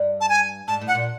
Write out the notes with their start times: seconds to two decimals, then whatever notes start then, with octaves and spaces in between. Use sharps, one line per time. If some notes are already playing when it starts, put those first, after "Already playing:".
Already playing: G2
0.21 A5
0.29 G#5
0.68 G#2 A5
0.81 A2
0.88 F#5
0.95 A#2